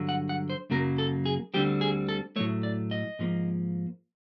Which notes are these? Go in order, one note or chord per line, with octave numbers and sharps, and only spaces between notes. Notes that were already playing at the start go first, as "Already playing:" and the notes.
Already playing: G2 D3 F#3
F#5
F#5
C5
F#2 C#3 F#3 A#3 A#4
A4
G#4
D2 D3 G3 C4 G4
G#4
A4
A2 F#3 A3 C#5
D5
D#5
G#2 F3 A#3